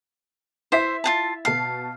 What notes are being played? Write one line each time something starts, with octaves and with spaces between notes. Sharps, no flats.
E4 C5 E5 B6
F4 G#4 A5
B2 F5 A5 C7